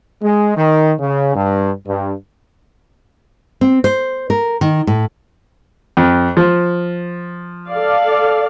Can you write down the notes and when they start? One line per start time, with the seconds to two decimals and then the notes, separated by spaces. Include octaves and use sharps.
0.23 G#3
0.57 D#3
1.00 C#3
1.35 G2
1.87 G2
3.61 C4
3.84 C5
4.30 A#4
4.61 D#3
4.87 A2
5.97 F2
6.37 F3
7.68 A4 D5 F5